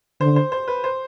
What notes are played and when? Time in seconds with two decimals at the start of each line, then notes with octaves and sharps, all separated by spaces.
0.21 D3 C5
0.36 C5
0.52 C5
0.68 B4
0.84 C5